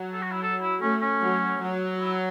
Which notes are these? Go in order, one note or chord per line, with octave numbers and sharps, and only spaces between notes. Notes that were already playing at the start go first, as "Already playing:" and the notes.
Already playing: F#3
A4
F#4
E4
A4
E4
A3 C#4
C#4
F#3
F#3
E4